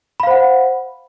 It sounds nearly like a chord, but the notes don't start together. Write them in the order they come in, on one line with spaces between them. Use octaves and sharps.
B5 F5 C5 F#5